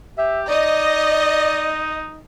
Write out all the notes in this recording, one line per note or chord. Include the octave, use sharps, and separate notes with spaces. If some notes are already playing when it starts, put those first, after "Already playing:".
G4 E5
D#4 D5 D#5